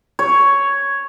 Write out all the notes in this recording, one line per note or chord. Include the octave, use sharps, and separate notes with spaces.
C#5